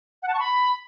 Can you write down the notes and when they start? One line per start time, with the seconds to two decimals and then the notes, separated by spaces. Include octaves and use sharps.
0.22 F#5
0.28 A5
0.34 C#6
0.39 B5